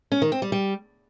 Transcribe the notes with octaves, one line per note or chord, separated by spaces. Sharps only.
C#4
D#3
C4
G3
G3